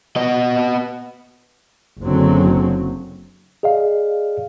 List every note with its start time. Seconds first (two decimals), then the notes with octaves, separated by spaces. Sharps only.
0.16 B3 D#5
2.01 F#1 D3 F#3 C4
3.63 G#4 D5 D#5 F5